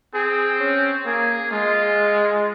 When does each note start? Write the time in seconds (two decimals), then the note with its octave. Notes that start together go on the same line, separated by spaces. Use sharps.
0.14 C4 G#4
0.60 C#4
1.06 A#3 G#4
1.51 G#3 F4